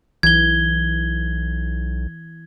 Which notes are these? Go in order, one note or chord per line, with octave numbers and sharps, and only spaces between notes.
B1 E3 G#6 G7